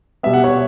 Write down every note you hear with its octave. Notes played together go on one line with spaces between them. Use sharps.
B2 G3 B3 E5
F#5
C#5 E5